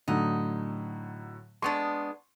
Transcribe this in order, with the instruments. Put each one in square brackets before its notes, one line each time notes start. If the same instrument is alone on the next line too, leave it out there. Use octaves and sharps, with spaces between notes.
[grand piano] A2 D3 F#3 [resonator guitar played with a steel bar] D#4
[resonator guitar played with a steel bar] G#3 B3 D4 [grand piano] C6 C#6